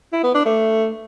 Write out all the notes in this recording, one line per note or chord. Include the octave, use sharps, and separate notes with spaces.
E4
B3
D4
A3